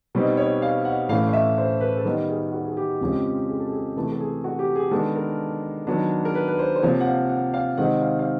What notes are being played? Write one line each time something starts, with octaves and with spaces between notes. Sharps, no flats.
B2 G3 C4 D#4
C#5
F5
F#5
A2 E3 A3 C#4 F5
F5
E5
C5
B4
A4
D#3 G3 B3 D#4 A#4
G#4
F#4
G#4
G4
F2 C#3 F3 G#3 C#4
G#4
A4
G#4
C3 E3 A3 A4
A4
G#4
F#4
G4
G#4
D#3 G#3 B3 D4 A4
A#4
D#3 F#3 B3 D4
A#4
B4
B4
C5
C5
C3 F3 A#3 C#5
F#5
F5
F#5
F5
C3 D#3 G#3 C4 D#4 F#5
F5
F5